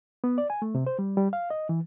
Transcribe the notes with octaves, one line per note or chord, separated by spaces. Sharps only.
B3
D5
G#5
A3
C3
C5
G3
G3
F5
D#5
E3